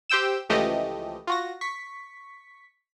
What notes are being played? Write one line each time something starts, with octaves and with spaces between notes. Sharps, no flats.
G4 C5 G5 E6 E7
C#2 E3 F3 A3 G4 D#5
F4 F#4 A#6
C#6 B6